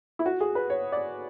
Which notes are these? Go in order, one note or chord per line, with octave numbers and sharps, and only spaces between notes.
E4
F#4
G#4
B4
C#5
D5